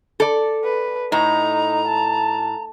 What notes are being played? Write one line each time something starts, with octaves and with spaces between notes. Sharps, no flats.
A4 D5
B4
A2 D#4 A#5
A5